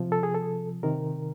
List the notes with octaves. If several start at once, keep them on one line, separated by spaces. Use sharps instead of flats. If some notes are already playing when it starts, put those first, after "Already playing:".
Already playing: C3 F3
A4
G#4
A4
C3 D#3 A#4